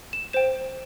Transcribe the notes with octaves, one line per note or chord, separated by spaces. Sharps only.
E7
C5 G5 E7